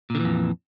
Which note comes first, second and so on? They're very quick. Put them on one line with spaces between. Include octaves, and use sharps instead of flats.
A#2 D3 E3 F2